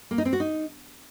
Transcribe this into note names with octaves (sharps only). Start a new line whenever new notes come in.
A#3
D#4
C4
F#4
D#4